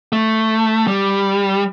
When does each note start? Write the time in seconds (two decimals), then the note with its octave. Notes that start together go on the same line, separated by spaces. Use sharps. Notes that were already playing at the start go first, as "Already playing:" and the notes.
0.12 A3
0.87 G3